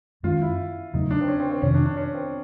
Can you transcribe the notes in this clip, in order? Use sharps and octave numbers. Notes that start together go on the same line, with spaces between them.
F#2 D#3 G#3 C#4 F4
E4
E2 C#3 F#3 A3 D#4
D4
C4
C#4
C4
C4
F2 C3 D#3 C#4
D4
D4
C#4
C4